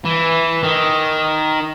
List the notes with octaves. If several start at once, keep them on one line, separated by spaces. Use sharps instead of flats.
E3
D#3